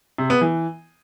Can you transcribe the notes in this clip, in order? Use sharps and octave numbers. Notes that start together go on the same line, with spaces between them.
C3
B3
E3